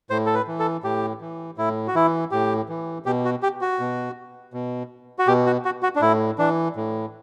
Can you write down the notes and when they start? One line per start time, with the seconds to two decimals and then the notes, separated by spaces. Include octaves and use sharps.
0.10 A2 C5
0.26 A4
0.35 B4
0.47 E3
0.59 A4
0.84 A2 G4
1.21 E3
1.58 A2 E4
1.88 F#4
1.95 E3 E4
2.31 A2 G4
2.69 E3
3.06 B2 G4
3.25 F#4
3.43 G4
3.61 F#4
3.79 B2
4.54 B2
5.19 F#4
5.28 B2 G4
5.46 F#4
5.65 F#4
5.83 F#4
5.96 D4
6.01 A2 E4
6.38 E3 D4
6.76 A2